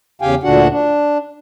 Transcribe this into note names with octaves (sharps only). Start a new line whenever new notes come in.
E2 C#3 G4 F5 G5 G#5
D2 A#2 D3 D4 F#4 F#5
D4